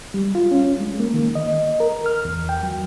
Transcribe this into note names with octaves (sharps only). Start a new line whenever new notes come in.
G3
F4
C#4
G#3
A#3
D#3
D#5
A#4
F6
E2
G5
F#3